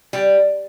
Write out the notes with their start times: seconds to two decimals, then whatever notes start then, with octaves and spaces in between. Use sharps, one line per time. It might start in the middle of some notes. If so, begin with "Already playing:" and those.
0.13 G3